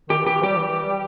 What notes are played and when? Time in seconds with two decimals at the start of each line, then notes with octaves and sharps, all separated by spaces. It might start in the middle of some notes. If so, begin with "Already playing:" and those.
0.09 D#3 G4
0.18 E3
0.27 G4
0.43 G3 G4
0.56 E3
0.69 E3
0.82 G3